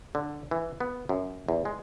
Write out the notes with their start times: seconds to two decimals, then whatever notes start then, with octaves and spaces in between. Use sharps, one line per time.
0.15 D3
0.51 E3
0.80 B3
1.09 F#2
1.49 E2
1.65 G#3